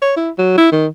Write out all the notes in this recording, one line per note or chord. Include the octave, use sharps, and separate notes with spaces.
C#5
E4
F#3
E4
D#3